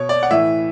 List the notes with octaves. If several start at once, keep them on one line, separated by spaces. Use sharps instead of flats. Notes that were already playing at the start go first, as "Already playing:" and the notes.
Already playing: B2 C#5
D5
F#5
A2 E3 E5